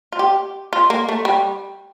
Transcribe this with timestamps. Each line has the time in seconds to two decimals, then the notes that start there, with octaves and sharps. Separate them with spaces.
0.12 F4
0.19 G4
0.73 F4
0.90 A#3
1.09 A3
1.25 G3